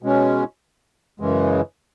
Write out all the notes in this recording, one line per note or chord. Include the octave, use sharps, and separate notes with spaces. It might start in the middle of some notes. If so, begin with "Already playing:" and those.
B2 G#3 C#4
F#2 C#3 E3 G#3